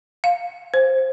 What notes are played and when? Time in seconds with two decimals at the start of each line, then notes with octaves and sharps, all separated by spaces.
0.24 F5
0.74 C5